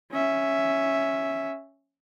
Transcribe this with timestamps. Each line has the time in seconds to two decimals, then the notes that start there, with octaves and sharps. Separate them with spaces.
0.12 C#4 E5